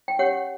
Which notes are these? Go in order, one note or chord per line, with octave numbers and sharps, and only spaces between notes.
G5
C#4 G4 C#5 F#5